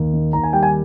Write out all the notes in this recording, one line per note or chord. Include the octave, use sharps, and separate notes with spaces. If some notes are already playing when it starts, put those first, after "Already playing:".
Already playing: D#2
D#3
D#2 A#5
G#5
G3 G5
G#5